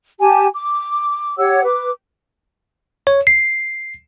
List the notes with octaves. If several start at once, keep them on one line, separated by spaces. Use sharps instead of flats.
G4 G#5 A5
D6
G4 C#5 F#5 E6
B4 D6
C#5
C7